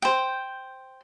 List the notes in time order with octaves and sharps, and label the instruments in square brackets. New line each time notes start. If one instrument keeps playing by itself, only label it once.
[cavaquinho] C5 G5